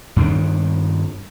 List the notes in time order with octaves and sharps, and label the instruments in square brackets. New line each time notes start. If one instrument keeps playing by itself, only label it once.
[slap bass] G2 D#3 C4 D4